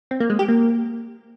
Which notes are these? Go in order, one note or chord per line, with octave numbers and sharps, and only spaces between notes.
C4
A#3
G#3
G4
A#3